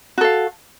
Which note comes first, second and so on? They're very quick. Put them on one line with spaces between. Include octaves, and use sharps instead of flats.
F#4 A4 F5